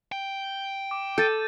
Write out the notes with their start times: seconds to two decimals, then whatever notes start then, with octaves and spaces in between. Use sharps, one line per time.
0.12 G5
0.91 D6
1.18 A4 G6 A6 D#7